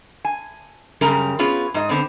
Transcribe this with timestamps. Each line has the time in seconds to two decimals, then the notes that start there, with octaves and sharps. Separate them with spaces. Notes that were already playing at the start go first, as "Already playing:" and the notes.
0.25 G#5
1.01 F#2 C#3 G3 A#4 A#5
1.39 B3 C#4 F4 G#4
1.74 G#2 D#5
1.89 D3 B3 C4